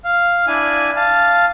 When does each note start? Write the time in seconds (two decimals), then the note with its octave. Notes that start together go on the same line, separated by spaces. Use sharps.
0.04 F5
0.47 D4 E4 G#5
0.96 F5 A5